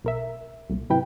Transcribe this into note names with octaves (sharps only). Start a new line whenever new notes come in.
B1 A#4 E5
C2 A#2
G#1 C3 F#3 E4 B4 G5